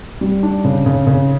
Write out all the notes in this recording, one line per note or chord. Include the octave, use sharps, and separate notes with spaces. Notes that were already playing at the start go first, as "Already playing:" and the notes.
G3
D4
C#3
C#3
C#3